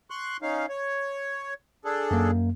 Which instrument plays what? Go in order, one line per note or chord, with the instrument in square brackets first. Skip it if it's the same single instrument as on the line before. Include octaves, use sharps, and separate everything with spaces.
[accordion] C6 C#6 F#6
C#4 D#4 F5
C#5
D4 G#4 A4
[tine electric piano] F#2 A#3